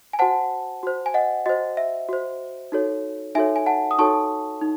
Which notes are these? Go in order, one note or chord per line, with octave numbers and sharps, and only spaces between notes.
G#5
F#4 C5 F#5 A5
F#4 C5
G#5
D#5 F#5
F#4 C5 D#5
E5
F#4 C5
D#4 F#4 A4 C#5
D#4 F#4 A4 C#5 E5 G#5
G#5
F#5 A5
D#6
D#4 F#4 A4 C#5 A5 C#6
D#4